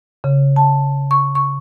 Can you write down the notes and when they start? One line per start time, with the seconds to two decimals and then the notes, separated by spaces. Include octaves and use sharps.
0.24 C#3
0.56 A5
1.11 C#6
1.35 C#6